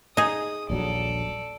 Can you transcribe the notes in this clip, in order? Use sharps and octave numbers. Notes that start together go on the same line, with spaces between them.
D#4 G#4 D#6
D#1 A#1 F#3 A4 D5